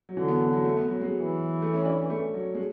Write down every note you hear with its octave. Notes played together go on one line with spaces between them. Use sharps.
F#3
D3 E3
B3
B3
F#3
A3
B3
F#3
G#3
E3
A3
C#4
D4
C#4
A3
F#3
G#3